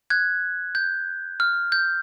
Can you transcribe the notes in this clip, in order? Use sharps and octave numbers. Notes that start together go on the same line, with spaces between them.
F#6 G#6
G6
F6
G6